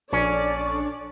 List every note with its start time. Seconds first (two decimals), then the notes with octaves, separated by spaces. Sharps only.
0.13 A#1 C#4 D4 A4 D5